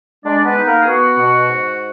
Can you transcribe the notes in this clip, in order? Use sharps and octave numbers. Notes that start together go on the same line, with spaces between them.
G#3 D4 D5
B3 B4
D#4
A#3 A#4
G#4
B3 F#4
B2
G#2